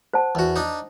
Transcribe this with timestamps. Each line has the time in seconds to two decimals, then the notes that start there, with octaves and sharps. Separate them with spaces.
0.13 C5 F#5 A5
0.35 E2 F#4
0.56 D4 D#4